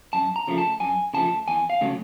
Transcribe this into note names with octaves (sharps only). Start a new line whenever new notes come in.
F#2 A5
A#5
C#3 F3 A3
A5
F#2 G#5
C#3 F3 A3 A5
E2 G#5
F5
C#3 F#3 A3